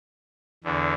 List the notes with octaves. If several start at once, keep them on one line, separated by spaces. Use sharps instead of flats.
E2 D3